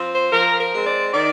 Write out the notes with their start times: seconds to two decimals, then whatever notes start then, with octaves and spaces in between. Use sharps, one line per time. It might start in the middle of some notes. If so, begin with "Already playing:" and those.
Already playing: F3 C4
0.13 C5
0.32 F3 A#4
0.59 A#4
0.73 G#3 C4
0.86 D5
1.13 D#3 D5